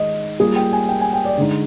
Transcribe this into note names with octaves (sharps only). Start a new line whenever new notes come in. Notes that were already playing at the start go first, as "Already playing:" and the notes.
Already playing: D#3 G#3 D#4 D#5
G3 A#3 F4 G#4
G5
G#5
G5
G#5
G5
D5
D3 G#3 D#4